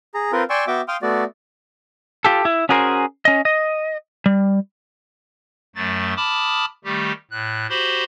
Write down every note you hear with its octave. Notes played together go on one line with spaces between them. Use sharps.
G#4 A#5
C4 F4 A#4 B4
D5 G5 G#5 C6 C#6 E6
B3 F#4 E5 G5 D6
F5 G5 C6 D#6 F6
A3 B3 F#4 D5
F4 G4 A4
E4
C#4 F#4 G#4 A#4 C5
C#4 D#5
D#5
G3
F#2 F#3 A3 A6
A5 B5 D6 D#6 F6
D#3 G3 A3 G4
A2 F#6
F#4 G4 C5 B5 C6